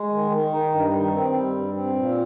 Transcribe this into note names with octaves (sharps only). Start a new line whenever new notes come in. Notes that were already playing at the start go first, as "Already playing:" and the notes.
Already playing: G#3
D#3
D#3
D#4
G2
D#3
C4
G3
G2
C4
A#2